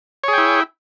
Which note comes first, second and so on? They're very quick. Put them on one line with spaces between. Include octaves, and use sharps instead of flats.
C#5 G#4 G5 E4